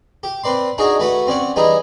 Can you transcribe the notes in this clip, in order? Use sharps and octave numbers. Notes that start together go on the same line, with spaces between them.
G4
C4 B4 D5 C6
D4 D#4 F#4 G#4 G#5
A3 F#4 A4 B4 F#5
C4 C#4 D5 F#5
E3 G3 D#4 E4 G#4